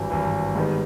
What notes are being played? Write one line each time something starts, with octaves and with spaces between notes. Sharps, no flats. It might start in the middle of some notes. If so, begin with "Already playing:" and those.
Already playing: G#1 G2 E3
G#1 G2 E3
G#2 D#3 G3 B3